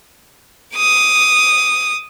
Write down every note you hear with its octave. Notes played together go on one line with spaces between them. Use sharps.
D6 D#6